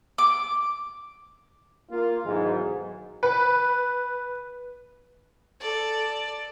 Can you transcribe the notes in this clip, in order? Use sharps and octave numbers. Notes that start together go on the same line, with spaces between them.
D6
A#3 F4
B1 G#2 D#3 E3 F#3 G#3
B4
A4 D5